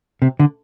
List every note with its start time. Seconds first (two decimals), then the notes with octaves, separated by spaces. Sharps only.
0.22 C3
0.39 D3